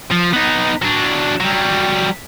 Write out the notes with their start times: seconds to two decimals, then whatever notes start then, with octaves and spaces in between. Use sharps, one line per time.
0.11 F3
0.33 B3 D#4
0.82 F#3 D4
1.40 F#3 G3